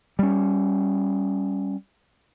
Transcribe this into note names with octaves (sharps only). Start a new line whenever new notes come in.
G3 C#4